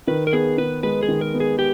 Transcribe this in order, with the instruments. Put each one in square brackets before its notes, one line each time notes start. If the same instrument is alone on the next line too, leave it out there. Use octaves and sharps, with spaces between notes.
[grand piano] D#3 [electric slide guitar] B4
[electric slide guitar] A#4
[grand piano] B3 [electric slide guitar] G#4
[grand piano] D#3 [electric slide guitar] B4
[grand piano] G#3 [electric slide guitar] B4
[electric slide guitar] G#4
[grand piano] D#3
[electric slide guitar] A#4
[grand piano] B3
[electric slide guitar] G#4
G4